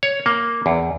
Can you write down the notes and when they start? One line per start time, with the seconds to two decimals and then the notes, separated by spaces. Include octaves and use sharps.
0.03 C#5
0.26 A#3
0.66 E2